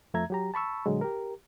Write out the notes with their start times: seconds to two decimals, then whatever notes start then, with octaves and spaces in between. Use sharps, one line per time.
0.14 F2 F3 A3 E5 A#5 G#6
0.30 F#3 G4 A#5
0.54 A5 B5 C#6 E6
0.86 A#2 D3 F#3 G#3
1.01 G4 A#4